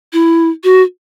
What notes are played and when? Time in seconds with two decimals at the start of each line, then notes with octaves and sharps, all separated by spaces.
0.13 E4
0.64 F#4